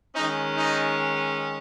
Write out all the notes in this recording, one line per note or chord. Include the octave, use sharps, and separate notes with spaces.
D#3 G#3 C#4 D#4
D#4